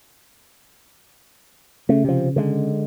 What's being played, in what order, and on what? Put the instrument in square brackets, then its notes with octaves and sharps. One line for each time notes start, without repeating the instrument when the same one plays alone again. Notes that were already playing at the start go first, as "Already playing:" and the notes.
[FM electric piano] C#3 [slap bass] A3
[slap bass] C3 F3
D3 G#3